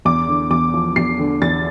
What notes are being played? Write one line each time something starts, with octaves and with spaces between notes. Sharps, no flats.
E2 D6
D3
E2 D6
F3
E2 C7
D3
E2 A6